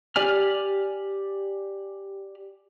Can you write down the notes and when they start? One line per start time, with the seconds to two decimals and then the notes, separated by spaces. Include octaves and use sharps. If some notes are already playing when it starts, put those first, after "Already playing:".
0.16 G4 D5 G#5 F6